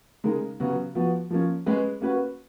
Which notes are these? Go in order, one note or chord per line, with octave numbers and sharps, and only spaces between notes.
C#3 G#3 D#4 A#4
C#3 F#3 B3 F#4
F3 B3 F#4
F3 A#3 C#4
G#3 C#4 G#4 B4
A#3 C#4 F#4 B4